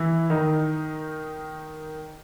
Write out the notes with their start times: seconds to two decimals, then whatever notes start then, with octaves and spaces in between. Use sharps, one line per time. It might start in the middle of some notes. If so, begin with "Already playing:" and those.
Already playing: E3 E4
0.30 D#3 D#4